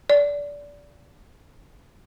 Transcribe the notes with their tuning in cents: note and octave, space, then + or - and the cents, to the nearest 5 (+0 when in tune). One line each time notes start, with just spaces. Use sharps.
D5 -20